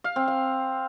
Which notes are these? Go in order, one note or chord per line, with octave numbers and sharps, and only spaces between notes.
F5
C4
F5